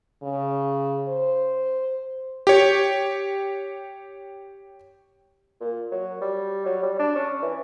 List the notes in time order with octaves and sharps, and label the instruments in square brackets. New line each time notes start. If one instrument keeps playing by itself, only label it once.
[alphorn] C#3
C5
[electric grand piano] G4 C#5
[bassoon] A#2
F#3
G3
F#3
G3
D4
C#4
E3